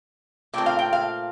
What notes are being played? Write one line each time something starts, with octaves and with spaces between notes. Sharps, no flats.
A#2 A3 C4 G5
F5
G5
F5